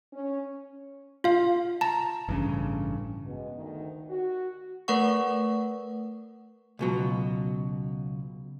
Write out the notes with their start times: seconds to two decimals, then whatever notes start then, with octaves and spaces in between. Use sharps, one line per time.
0.13 C#4
1.24 F4 F5
1.81 A5 A#5
2.29 A1 G2 C#3
3.25 B2 G#3 B3
3.55 D2 D#3
4.09 F#4
4.88 A3 A#4 B4 F#5 C#6
6.79 C#2 B2 F#3